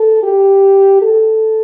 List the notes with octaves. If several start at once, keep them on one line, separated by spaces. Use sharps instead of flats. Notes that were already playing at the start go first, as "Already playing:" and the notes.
Already playing: A4
G4
A4